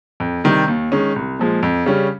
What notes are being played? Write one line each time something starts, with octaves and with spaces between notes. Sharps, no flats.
F2
C3 D#3 G3
D#2
D#3 G#3 C#4
C2
A#2 F3 G#3
F2
C#3 G3 C#4